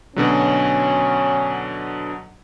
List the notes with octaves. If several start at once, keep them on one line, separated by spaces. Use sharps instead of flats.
B2 D3 F#3 C#4